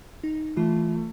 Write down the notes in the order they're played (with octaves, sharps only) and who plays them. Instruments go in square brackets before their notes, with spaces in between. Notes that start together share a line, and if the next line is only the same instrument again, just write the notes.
[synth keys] D#4
[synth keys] E3 F4 [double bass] A3